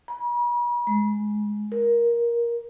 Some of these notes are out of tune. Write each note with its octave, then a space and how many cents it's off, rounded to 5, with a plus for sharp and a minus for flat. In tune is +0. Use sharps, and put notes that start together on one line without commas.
B5 -45
G#3 +15
A#4 +15